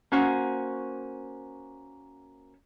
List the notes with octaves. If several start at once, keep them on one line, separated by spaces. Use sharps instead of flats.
A#3 C#4 F#4 C5